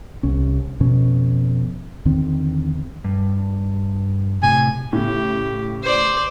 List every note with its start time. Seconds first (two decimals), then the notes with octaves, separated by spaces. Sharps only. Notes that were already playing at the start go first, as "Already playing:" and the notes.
0.23 C2 C#4
0.80 F2 B2 C#4
2.05 E2 D3 D#3 C4
3.04 G2
4.43 A2 C3 G#5
4.93 A2 C#3 G4
5.83 C5 D5